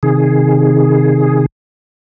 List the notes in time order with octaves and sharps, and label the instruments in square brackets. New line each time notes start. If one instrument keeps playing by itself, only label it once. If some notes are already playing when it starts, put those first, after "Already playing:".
[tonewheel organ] C3 D#3 G#4